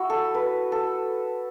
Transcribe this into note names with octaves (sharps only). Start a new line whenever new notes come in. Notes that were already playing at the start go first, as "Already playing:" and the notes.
Already playing: E4 F#4
A4
B4
A4